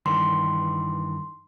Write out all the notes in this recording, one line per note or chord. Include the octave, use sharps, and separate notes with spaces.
G2 D#3 E3 C6